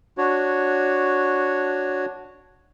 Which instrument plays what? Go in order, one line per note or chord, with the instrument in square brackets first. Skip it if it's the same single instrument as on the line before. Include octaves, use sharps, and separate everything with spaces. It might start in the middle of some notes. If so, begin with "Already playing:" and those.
[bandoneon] D4 F#4 C#5